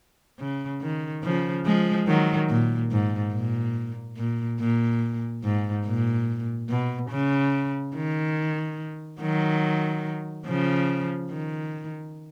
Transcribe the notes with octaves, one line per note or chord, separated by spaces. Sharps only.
C#3
D#3
C#3 F3
F3 G#3
D#3 F#3
A#2
G#2
A#2
A#2
A#2
G#2
A#2
B2
C#3
D#3
D#3 F#3
C#3 F3
D#3